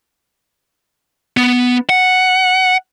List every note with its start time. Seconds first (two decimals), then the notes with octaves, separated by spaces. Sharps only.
1.37 B3
1.89 F#5